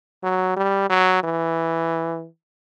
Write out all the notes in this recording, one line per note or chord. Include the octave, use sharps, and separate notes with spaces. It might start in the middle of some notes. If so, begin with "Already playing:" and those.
F#3
G3
F#3
E3